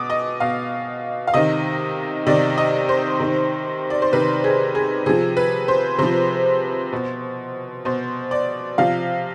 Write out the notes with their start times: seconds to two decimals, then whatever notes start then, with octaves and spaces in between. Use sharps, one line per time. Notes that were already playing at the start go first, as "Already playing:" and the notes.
Already playing: B2 D6 D#6
0.10 D#5
0.40 B2 F5
1.27 F5
1.34 C3 D#3 D#5
2.27 C3 D#3 D5
2.58 D#5
2.89 C5
3.20 C3 D#3
3.90 D5
4.02 C5
4.13 C3 D#3 B4
4.44 G#4
4.75 G#4
5.06 C3 F3 G#4
5.37 B4
5.68 C5
5.98 C3 F3 C5
6.93 B2
7.85 B2 C5
8.31 D5
8.78 C3 F3 F5